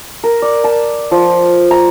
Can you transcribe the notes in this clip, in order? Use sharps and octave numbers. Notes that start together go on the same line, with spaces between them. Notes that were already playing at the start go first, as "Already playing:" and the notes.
A#4
D5
A5
F3
A#5